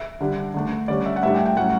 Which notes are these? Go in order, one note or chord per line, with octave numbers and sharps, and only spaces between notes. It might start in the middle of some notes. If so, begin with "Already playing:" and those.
Already playing: E5
D3 G3 D4
D3 A3 D4
D3 G3 C#4 D5
E5
F#5
A2 G3 D4 E5
G5
G5
A2 F#3 C#4 F#5